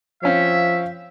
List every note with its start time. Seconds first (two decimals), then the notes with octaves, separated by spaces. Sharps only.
0.23 F3 C4 C#4 C#5 E5 F5